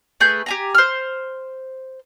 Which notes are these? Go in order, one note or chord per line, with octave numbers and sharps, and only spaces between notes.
A3 G#4 B4 G6
G4 G#5 A#5
C5 F6